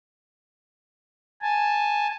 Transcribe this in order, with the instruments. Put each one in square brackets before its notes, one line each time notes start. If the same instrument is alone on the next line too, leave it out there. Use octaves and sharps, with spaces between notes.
[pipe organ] G#5 A5